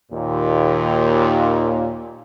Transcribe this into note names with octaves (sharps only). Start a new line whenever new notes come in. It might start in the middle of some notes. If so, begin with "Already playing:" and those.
D#2 A#2